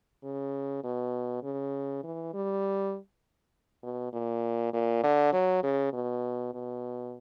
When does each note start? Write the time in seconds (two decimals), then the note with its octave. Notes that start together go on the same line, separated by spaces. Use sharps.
0.24 C#3
0.83 B2
1.43 C#3
2.04 E3
2.34 G3
3.83 B2
4.13 A#2
4.73 A#2
5.04 D3
5.33 F#3
5.63 C#3
5.93 B2
6.54 B2